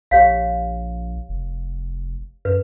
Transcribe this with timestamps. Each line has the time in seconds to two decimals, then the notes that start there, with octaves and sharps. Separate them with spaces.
0.11 A#1 G4 C#5 F5
1.29 F1
2.45 F#2 B4